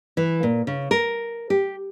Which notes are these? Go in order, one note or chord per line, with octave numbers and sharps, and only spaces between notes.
E3
A#2
C#3
A#4
G4